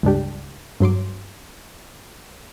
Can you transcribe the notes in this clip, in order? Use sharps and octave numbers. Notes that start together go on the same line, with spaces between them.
C#2 G2 D4 G4
G2 F#3 C6 D6